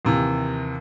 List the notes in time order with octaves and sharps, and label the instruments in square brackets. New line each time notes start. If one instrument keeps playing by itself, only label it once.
[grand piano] D#2 C3 E3